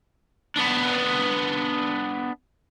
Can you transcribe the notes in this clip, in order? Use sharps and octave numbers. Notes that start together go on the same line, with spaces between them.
B3 D4